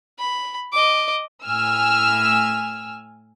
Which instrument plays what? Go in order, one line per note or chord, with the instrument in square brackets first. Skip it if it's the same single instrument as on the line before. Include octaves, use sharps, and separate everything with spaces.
[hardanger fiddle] B5
D#5 D6
[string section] A2 G#5 E6 F6